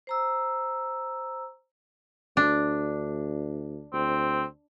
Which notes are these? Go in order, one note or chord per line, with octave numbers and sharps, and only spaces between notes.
C5 A#5 E6
D2 D4
D2 C4